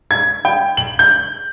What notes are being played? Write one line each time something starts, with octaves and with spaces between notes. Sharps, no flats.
G#6
G5
F#7
G6